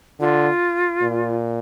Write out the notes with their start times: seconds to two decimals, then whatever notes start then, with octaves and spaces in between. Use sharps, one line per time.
0.20 D3 F4
1.03 A#2